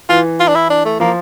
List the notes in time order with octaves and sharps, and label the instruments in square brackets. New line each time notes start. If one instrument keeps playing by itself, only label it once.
[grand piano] E3 [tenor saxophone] F4
[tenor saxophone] F4
D4
E4
D4
A3
[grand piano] F3 [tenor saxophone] A#3